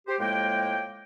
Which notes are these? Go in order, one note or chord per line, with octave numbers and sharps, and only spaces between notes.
G4 C5
A2 F3 G#3 A#3 G5